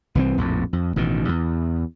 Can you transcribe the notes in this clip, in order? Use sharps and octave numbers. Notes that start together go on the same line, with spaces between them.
C2 E3 G#3 C4
A#1 F2 A2
F2
A1 B2 D#3
E2